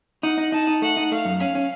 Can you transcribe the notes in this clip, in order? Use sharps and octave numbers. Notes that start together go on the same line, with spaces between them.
D#4 F#5
D#4
D#4 A5
D#4
A3 F#5
D#4
A3 F5
F#2
C#4 F5
C#4